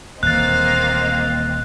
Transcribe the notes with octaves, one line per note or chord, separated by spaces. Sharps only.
D#1 E3 A#3 C4 D#5 F5 F#6 A6